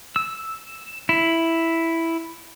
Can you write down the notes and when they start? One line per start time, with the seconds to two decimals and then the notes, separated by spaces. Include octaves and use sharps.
0.16 E6
1.09 E4